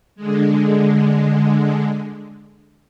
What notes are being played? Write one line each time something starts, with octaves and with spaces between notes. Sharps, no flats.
D3 G#3